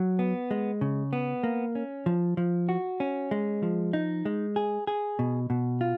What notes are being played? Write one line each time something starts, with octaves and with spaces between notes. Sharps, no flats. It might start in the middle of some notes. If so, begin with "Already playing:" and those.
Already playing: F#3
B3
G#3
C#3
B3
A#3
C#4
F3
F3
F#4
C#4
G#3
F3
D#4
G#3
G#4
G#4
B2
B2
F4